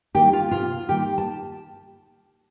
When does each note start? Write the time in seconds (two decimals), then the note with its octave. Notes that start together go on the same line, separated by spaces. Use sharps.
0.15 D#3 G3 A#3 G4 G5
0.33 F4 F5
0.51 C3 F4 F5
0.89 D#3 G3 A#3 G4 G5
1.18 A5